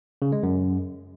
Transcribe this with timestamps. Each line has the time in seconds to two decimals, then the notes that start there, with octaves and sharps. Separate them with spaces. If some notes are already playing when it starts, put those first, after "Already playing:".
0.22 C#3
0.32 G#3
0.43 F#2